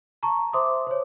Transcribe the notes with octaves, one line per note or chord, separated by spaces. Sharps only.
A5 A#5 C#6
C5 E5 C6 D6 D#6
C5 C#5